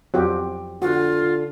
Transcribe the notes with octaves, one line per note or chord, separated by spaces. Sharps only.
F2 F3 F#3 C4 F#4 G4
D3 F4 F#4